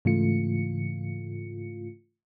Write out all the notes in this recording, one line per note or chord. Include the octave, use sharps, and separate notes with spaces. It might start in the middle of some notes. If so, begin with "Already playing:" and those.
G#2 C#3 E3 A3 F4 C#7